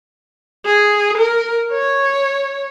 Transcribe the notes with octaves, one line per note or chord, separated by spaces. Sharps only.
G#4
A#4
C#5